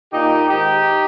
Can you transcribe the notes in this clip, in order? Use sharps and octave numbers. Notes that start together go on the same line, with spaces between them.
A#2 D#4 G4
G#2 D#3 D#4 G4